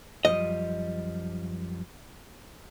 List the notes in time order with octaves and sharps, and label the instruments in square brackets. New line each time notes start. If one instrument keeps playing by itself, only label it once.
[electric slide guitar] F#2 F3 G3 [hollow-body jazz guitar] D#5